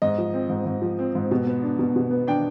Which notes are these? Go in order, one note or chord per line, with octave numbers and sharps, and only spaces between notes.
G#2 D#5
F3
C4
G#2
G#2
F3
C4
G#2
B2
B3
D4
B2
B2
B3
D4 G5